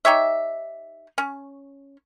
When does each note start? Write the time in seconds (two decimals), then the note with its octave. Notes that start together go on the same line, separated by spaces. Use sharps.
0.05 D#4 G4 C#5 E5
1.18 C#4